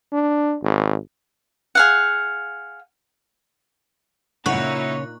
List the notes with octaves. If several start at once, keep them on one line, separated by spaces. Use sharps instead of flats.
D4
G#1
G#4 F5 F#5
A#2 C#3 D#4 E4 C#5 F#5 C#6 F#6